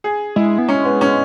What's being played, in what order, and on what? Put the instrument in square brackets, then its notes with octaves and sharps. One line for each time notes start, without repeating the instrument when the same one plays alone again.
[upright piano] G#4
[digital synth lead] G#3 [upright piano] E4
[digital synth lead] B3
[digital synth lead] G#3 [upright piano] C#4
[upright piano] B3
C#4